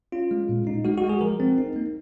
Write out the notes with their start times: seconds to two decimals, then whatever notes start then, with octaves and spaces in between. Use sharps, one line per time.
0.12 C#4 F4
0.31 G#3
0.49 A#2
0.67 D#4
0.85 G#3 F#4
0.97 F#4
1.04 G#3
1.09 G#4
1.21 F3 A#4
1.40 C4
1.58 D#4
1.76 A#3